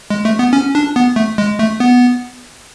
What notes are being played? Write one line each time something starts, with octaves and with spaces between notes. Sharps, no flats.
G#3
A3
B3
C#4
D4
B3
A3
G#3
A3
B3